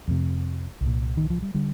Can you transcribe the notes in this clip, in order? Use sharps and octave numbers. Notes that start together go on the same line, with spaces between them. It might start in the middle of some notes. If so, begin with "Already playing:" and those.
F2 C3
C2 A#2
D#3
F3
G3
D3 G3